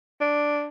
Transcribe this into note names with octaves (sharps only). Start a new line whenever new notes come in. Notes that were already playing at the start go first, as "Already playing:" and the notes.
D4